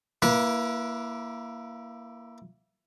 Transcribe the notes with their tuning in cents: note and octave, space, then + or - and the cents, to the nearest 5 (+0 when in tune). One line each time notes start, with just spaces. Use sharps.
A#3 +0 E4 +15 B4 -30